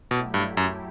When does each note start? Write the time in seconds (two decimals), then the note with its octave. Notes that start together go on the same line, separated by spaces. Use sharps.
0.10 B2 F#3 A3 E4 G4
0.34 G2
0.57 F#2